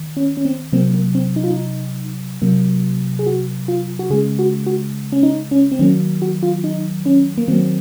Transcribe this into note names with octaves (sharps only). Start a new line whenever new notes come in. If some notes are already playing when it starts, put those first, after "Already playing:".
Already playing: D#3
C#4
C#4
C4
C3 F#3 A#3 C4
A#3
C4
D#4
F4
D#4
C3 F#3 A#3
G#4
F#4
F4
F#4
C#3 G#3 G#4
F#4
F#4
C#4
D#4
C#4
C4
D#3 F#3 A#3 C#4
F#4
F4
D#4
C#4
A#3
D#3 F#3 A#3 C4